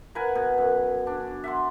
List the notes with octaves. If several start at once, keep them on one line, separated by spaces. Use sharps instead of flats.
A#4 B4 F#5 G#5
B2
F#2
D4
E5 F#5 C6